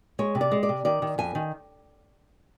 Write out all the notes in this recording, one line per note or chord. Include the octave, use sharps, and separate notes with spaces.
G#3 C#5
C3
D5
G#3
D5
C3
D#3 D5
D#3
F2 G#5
D#3